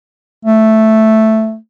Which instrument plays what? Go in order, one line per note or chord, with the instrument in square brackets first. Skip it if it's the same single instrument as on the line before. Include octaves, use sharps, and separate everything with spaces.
[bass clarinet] A3